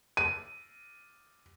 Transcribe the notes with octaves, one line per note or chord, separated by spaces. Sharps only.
D#7